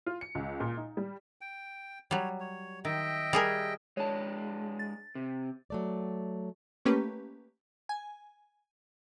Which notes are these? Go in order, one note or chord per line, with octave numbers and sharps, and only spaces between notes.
F4
C#7
C#2
A#2
D#4
G3
G5
F#3 G3 C#5
C#5
D#3 D#5 E5 G5
G3 G#4 A#4
G#3 D4 C#5 A5
A6
C3
F#3 A3 D5
A3 A#3 C#4 G4 B4
G#5